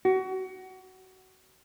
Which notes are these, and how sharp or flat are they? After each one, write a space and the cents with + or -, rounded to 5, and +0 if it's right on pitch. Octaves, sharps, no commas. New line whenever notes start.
F#4 +25